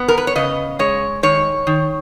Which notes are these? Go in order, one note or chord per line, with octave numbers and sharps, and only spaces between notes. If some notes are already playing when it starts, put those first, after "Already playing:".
Already playing: B3
A#4
B4
C#5
C#3 D#5
G#3 C#5
D#3 C#5
D#3